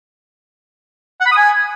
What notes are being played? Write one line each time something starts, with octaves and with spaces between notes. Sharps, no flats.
F#5
B5
D#6
G#5